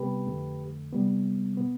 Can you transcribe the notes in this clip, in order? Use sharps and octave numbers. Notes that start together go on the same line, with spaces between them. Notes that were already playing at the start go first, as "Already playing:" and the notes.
Already playing: C3 G3 B3 G4 B4
F2 D3 A3
C3 G3 B3
B2 B3